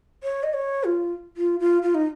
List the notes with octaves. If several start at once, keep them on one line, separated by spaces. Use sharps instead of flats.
C#5
D#5
C#5
F4
F4
F4
F4
D#4